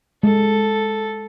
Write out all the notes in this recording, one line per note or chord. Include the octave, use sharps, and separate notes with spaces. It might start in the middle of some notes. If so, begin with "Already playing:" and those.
G#3 A4